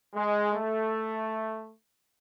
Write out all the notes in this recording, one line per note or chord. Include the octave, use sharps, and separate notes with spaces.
G#3
A3